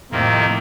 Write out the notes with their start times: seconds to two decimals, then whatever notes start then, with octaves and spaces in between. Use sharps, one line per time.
0.11 F2 A2 C3 D#3 A#3